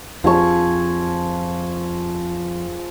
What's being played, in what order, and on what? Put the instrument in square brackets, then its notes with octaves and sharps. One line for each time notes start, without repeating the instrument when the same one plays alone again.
[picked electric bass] F2 [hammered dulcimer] F3 G#4 C#6